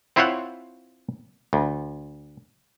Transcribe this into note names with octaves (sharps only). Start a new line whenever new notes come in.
C4 E4 F4 C5 C#5 F#5
D2